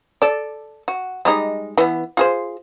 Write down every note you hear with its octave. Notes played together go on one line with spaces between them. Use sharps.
A4 D5
F#4
G3 G#3 D#4
E3 B3
F4 G#4 C5